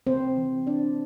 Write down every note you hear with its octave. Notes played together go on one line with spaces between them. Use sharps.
C3 C4 C5
E3
E3 D4 D5